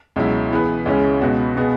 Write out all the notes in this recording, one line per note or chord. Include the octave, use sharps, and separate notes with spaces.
C#2 B2 F#3 E4
E3 B3 G#4 B4
C#2 C#3 G#3 C#4 E4
C#2 B2 B3 F#4 B4
B2 B3 G#4